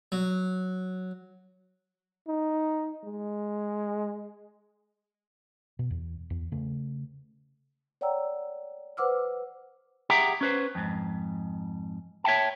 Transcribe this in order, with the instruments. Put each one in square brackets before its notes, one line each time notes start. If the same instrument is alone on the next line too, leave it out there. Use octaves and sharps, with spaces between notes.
[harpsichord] F#3
[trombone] D#4
G#3
[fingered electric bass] B2
E2
E2
C#3 A3
[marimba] C#5 D5 F#5 G5 A#5 E6
B4 C5 F#5 D6 E6 F6
[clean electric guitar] G4 G#4 E5 F#5 G5 A#5
C#4 B4 C5
F2 G#2
C#5 E5 F#5 G5 A5